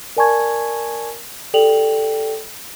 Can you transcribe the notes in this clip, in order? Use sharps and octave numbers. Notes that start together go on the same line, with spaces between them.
A#4 D5 G#5 A5 C#6 G#6
G4 A4 D5 G5 F7 F#7